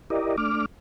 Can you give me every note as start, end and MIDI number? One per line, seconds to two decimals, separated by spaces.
0.10 0.36 64
0.10 0.36 67
0.10 0.36 70
0.10 0.36 74
0.10 0.36 75
0.38 0.66 57
0.38 0.66 62
0.38 0.66 86
0.38 0.66 89